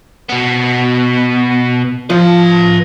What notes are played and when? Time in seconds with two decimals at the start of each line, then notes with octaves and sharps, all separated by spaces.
0.29 B2 B3
2.10 F3 B4 A5